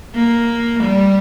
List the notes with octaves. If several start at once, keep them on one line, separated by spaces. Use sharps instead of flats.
A#3
G3